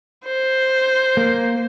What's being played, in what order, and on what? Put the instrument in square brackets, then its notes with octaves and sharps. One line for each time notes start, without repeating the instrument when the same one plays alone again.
[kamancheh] C5
[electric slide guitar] A#3